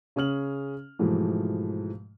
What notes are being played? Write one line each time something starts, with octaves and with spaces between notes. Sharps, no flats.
C#3 C#4 G#4 F6 F#7
G#2 B2 E3 F3 A3